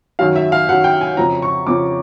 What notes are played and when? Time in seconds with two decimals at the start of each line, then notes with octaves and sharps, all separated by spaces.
0.19 F#2 D#3 F#3 F5
0.36 E5
0.52 F5
0.68 F#2 D#3 F#3 F#5
0.84 G5
1.01 G#5
1.17 F2 C#3 F3 A#5
1.42 C#6
1.67 F2 C#3 F3 D6